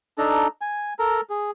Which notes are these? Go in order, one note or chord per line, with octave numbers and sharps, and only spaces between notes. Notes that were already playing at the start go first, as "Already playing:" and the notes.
D4 D#4 A4 A#5
G#5
A4 A#4 A#5
G#4